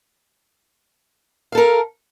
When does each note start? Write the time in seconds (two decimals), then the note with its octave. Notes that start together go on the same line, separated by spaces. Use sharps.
1.52 F5
1.55 A4
1.57 A#4